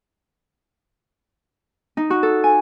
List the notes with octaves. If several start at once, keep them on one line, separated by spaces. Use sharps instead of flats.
D#4
F#4
A4
G#5